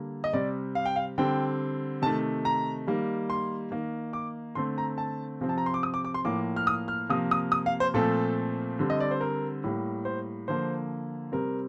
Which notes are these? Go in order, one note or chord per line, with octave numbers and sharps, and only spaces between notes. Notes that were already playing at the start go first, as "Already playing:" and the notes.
Already playing: D3 G3 A#3
D#5
C3 G3 C4 D5
F5
G5
F5
D3 G3 C4 G5
C3 D#3 A3 A5
A#5
D#3 G3 A#3
C6
D#3 A#3
D6
D3 A3 C4 C6
A#5
A5
C3 F3 C4
A5
A#5
C6
D6
D#6
D6
D6
C6
A2 F3 A#3 D6
F6
D#6
F6
C3 F3 A#3 D#6
D#6
D#6
F5
C5
A#2 F3 A3 C4 A4
D3 G3 C4
D#5
D5
C5
A#4
A2 G3 A#3
C5
D3 F3 A#3 C5
C3 G3 C4 A#4